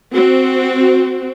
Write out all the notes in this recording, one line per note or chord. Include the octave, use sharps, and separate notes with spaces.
C4 F#4